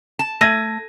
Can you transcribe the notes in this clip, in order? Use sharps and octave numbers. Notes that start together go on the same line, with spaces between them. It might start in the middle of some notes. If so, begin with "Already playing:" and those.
A5
A3 G#6 A#6 D#7